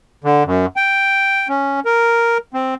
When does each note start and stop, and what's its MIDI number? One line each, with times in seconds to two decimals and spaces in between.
0.24 0.43 50
0.46 0.66 42
0.76 1.48 79
1.48 1.80 61
1.85 2.38 70
2.54 2.74 60